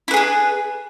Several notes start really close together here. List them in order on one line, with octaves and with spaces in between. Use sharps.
E4 B4 G#4 D4